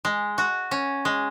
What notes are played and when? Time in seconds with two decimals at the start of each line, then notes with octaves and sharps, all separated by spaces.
0.05 G#3
0.38 F#4
0.71 C#4
1.05 G#3